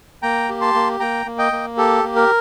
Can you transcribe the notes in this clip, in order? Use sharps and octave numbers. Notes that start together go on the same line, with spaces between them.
A#3 G5 A#5
G4
A5 C6
A#3
A#3 G5 A#5
A#3
D#5 G5
A#3
G4 A4
A#3
A#4